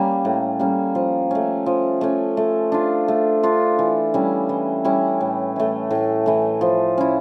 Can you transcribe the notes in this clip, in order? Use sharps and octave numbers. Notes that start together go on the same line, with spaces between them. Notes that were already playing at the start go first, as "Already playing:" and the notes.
Already playing: G3 A#3 C#4
A2
G3 A#3 C#4
F3
A3 C#4
F3
A3 C#4
A3
D4 F4
A3
D4 F4
E3
G3 C#4 E4
E3
G3 C#4 E4
A2
E3 A3
A2
E3 A3
F3
C#4 E4